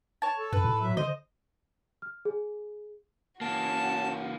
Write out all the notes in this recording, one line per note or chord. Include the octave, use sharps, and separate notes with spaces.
C#5 A5
A4
F#2 B4
A2
F#3 E5
D3 C5 D#5
F6
G#4
E3 A#3 C#4 F#4 A5